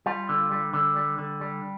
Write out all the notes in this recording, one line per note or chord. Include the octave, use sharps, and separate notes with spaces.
G3 F4
D3
G3
D3
G3
D3
G3